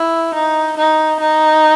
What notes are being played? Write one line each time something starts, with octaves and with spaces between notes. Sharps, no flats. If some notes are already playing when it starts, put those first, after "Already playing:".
Already playing: E4
D#4
D#4
D#4